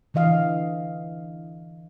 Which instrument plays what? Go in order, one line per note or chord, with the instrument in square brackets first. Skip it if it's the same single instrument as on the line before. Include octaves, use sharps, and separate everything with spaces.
[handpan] D3 E3 D#5 F5